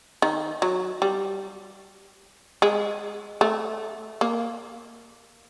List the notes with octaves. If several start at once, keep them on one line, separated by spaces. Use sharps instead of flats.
D#3
F#3
G3
G#3
A3
A#3